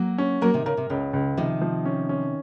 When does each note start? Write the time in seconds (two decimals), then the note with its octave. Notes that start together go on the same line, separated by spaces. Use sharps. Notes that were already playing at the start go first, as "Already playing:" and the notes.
Already playing: F#3 A#3
0.18 C#4
0.41 F#3 A#3 A#4
0.54 C3 D#3
0.66 C#3 A#4
0.77 C3
0.90 C#2 C#3
1.13 C#2
1.37 C3 D#3 F3
1.61 F3
1.85 C#4
2.09 C#4